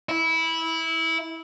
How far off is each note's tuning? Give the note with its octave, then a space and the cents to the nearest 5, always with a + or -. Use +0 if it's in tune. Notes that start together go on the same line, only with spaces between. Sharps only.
E4 -15